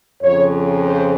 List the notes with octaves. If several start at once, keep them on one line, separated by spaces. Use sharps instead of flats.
F2 C#3 F3 C#5
C5